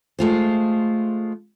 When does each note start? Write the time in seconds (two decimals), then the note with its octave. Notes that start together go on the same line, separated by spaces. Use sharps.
0.19 G#3 A3 F4 C5